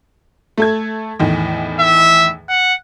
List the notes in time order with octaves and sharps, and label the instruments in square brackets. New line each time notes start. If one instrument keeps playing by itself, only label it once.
[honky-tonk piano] A3 A4 G#6
E2 A2 D#3
[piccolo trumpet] E5
F#5